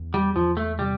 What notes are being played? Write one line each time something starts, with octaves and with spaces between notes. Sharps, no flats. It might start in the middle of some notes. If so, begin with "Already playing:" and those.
Already playing: E2
G3
E2 F3
A3
C3 G3